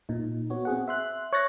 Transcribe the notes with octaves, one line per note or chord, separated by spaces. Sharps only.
A#2 D#4
B3 F#4 C#5
C4 G#4 F#5
E5 C6 F#6
C#5 C#6 F#6 A6 A#6